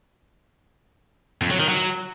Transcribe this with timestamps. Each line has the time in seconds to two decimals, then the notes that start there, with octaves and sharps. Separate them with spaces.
1.42 F2
1.51 F#3
1.60 D#3
1.69 F#3